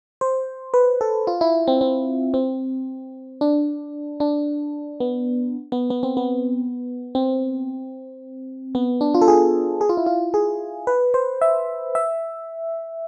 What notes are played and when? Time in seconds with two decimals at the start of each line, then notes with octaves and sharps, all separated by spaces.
0.21 C5
0.74 B4
1.01 A4
1.27 F4
1.41 E4
1.68 C4
1.81 C4
2.34 C4
3.41 D4
4.20 D4
5.00 B3
5.72 B3
5.90 B3
6.03 C4
6.17 B3
7.15 C4
8.75 B3
9.01 D4
9.14 F4
9.21 A4
9.28 G#4
9.81 G#4
9.89 F4
9.97 E4
10.06 F4
10.34 G#4
10.87 B4
11.14 C5
11.42 E5
11.95 E5